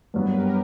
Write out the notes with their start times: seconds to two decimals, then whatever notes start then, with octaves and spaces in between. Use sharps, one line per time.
0.14 G2 F#3 B3 B4
0.27 A#4
0.38 G4